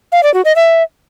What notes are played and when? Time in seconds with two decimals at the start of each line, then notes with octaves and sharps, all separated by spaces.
0.12 F5
0.23 D5
0.34 F#4
0.45 D#5
0.56 E5